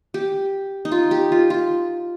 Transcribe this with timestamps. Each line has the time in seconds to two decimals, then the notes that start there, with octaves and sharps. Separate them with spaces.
0.14 G4
0.85 D#4
0.92 F4
1.11 G4
1.32 F4
1.50 F4